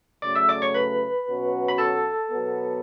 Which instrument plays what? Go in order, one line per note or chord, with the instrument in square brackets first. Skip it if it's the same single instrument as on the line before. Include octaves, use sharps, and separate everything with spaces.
[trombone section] C#3 F#3 A3 [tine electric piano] D5 D6
[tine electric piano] E5 E6
D5 D6
C#5 C#6
B4 B5
[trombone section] B2 F#3 C#4 F#4
[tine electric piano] B5
A4 A5
[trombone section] B2 F#3 B3